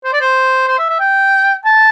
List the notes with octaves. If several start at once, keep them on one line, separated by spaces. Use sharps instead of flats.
C5
D5
C5
C5
E5
E5
G5
A5